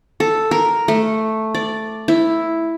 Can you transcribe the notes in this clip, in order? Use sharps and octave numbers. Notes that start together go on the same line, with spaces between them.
A4
A#4
A3
D5
E4